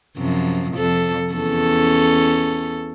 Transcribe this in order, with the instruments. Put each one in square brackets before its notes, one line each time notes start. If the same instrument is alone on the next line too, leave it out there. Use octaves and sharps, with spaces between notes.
[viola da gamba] F#2 C3 F3
F2 A4
E2 C#4 A4